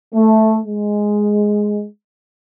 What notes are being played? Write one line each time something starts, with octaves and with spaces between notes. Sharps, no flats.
A3
G#3